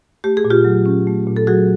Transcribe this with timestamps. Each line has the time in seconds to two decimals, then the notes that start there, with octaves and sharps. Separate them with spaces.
0.24 A3 G4
0.37 G#4
0.45 A#2
0.50 F4 G4
0.64 F#3
0.86 C#4
1.07 A3
1.27 A#2
1.36 A4
1.47 F#3 F#4 G#4